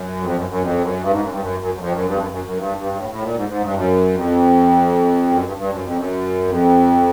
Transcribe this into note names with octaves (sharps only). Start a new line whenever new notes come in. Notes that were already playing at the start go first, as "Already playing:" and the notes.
Already playing: F#2
F2
F#2
F#2
F2
F#2
G2
G#2
F#2
G2
F#2
F#2
F#2
F2
F#2
G2
F2
F#2
F#2
F#2
G2
G2
A2
A2
A#2
G#2
G#2
G2
F#2
F2
F#2
G2
G2
F#2
F2
F#2
F2